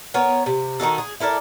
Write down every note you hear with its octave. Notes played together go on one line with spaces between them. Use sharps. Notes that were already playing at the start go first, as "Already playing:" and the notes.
B3 A#4 C#5
C3
D#3 D#4 F#4 A4
G#4
E4 A4 A#4 D5